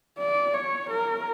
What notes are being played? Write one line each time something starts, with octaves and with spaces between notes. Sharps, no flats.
D5
C#5
A#4